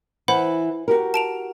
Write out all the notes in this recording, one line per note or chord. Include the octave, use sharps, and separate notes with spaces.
E3 C5 F#5 B5
F#4 G4 A#4
A5 D7 F7